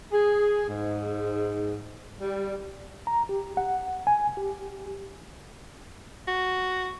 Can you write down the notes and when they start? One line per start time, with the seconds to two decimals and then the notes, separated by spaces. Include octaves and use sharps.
0.12 G#4
0.68 G#2
2.20 G3
3.07 A#5
3.29 G4
3.57 F#5
4.07 G#5
4.37 G4
6.28 F#4